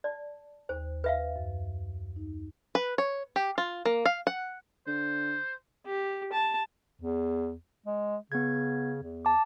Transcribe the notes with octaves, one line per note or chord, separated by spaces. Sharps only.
D5 A5
D#2 C5
B4 E5 F5
F#2
D#4
B4
C#5
G4
F4
A#3
F5
F#5
D3 C5
G4
A5
E2
G#3
C#3 B3 G#6
E2
A5 D6